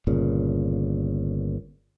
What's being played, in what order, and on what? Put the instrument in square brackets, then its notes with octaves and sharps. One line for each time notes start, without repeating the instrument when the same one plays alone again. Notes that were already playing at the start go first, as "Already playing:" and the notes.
[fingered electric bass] G1 A#2 C#3